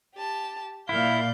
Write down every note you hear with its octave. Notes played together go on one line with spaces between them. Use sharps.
G4 A5
A#2 E4 D5 F5 G6